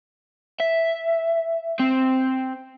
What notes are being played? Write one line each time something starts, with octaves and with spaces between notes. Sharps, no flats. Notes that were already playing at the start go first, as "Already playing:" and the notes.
E5
C4